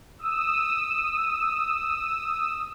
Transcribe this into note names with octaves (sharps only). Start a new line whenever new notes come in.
D#6 E6